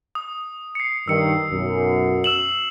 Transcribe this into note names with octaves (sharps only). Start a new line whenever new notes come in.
D#6
C7 C#7
G2 D#3 E6 C#7
B1 F#2
E6 E7 F#7